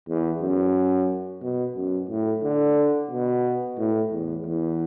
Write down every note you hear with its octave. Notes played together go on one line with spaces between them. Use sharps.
E2
F#2
B2
F#2
A2
D3
B2
A2
E2
E2